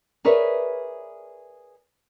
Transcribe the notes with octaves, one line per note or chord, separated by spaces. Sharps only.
G#4 A#4 B4 C#5 D5 E5